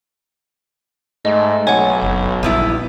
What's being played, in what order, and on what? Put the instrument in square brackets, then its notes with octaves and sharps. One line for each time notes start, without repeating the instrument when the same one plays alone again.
[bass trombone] G#2 [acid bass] A3 [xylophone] D#5
[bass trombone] B1 [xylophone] C#5 F#5 [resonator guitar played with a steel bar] G#5
[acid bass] F#1
[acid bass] A#1 [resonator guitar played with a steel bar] G3 B3 E4